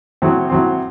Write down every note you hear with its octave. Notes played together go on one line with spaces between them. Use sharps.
A2 F#3 C4
A2 F#3 C4